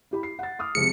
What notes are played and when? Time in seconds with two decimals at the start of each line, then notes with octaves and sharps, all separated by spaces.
0.11 E4 G4 B5
0.23 C7
0.39 F#5 A6
0.59 D6 D#6 F6
0.75 C3 F3 G#3 C#7